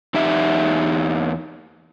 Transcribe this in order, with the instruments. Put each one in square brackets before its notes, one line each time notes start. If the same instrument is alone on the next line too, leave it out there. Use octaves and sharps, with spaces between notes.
[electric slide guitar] E2 D#4 G4 E5